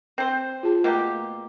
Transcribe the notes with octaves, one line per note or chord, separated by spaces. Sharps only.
C4 C5
F4 G#4 A5
B2 A3 A#3 G4